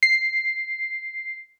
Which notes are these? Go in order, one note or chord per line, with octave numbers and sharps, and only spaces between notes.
C7